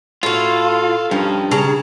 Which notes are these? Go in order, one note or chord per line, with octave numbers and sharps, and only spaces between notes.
A2 F4 F#4 A4 F5
G2 F3 C#4 D#4
C#3 G#4 A5 A#5